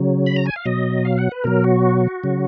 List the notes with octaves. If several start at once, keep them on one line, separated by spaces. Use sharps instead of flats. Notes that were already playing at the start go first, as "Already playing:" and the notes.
Already playing: C#3 F#3
B5
A#5
G#5
F5
B2 F#3 D#5
F5
F#5
B4
B2 F#3 A#4
F#4
C#3 F#3